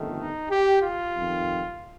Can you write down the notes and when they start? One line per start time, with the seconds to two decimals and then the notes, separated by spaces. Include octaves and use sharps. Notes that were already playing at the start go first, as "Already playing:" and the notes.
Already playing: G1 F2 D#3 A3
0.15 D#4
0.49 G4
0.82 F4
1.16 F2 D#3 G3